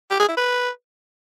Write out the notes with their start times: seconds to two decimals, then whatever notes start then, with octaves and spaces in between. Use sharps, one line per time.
0.11 G4
0.20 G#4
0.28 E4
0.37 B4